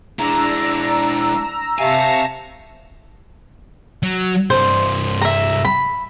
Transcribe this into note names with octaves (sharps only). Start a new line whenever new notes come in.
G#3 D4 E4 A#5 E6
C3 E5 F5 G#5 A5 C#6 A#6
F#3
C2 G2 C5
E5 A#5
B5